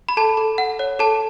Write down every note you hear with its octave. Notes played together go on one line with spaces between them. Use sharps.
B5
A4 A5
A4
F#5
C#5
A4 A5